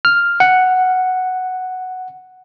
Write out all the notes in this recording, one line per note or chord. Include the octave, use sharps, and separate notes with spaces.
F6
F#5